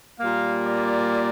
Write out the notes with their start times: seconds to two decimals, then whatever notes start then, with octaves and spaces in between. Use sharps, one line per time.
0.19 A#2 G3 A#3 F5
0.67 D5